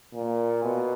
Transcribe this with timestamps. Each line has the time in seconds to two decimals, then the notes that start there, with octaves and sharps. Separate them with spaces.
0.14 A#2
0.63 B2